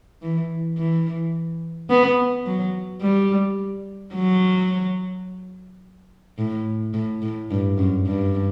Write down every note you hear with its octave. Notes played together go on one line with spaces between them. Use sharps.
E3
E3
B3
F#3
G3
F#3
A2
A2
A2
G2
F#2
G2